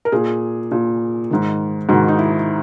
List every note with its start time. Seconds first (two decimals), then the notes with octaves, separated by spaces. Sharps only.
0.05 A#4
0.12 A#2 G#4
0.71 A#2
1.31 G#2 D#3
1.89 G#2 D#3 F#4
2.08 D#4
2.19 E4